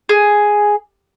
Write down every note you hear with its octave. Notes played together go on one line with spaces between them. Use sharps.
G#4